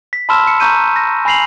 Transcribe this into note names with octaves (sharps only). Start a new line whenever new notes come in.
B6
A5 B5 C6 E6 F6 E7
C#7
A#5 C#6 G6 D#7
A#6
G#5 B5 A#6 C7 F7 F#7